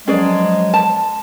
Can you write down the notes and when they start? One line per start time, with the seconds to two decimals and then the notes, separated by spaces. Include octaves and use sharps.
0.08 F3 F#3 G#3 C#4 G#4 D5
0.74 A5